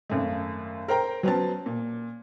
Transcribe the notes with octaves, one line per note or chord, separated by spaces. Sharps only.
G#1 F#2 A3
A#4 C5 G5 A#5
F#3 B3 C#4 C5 A5
A#2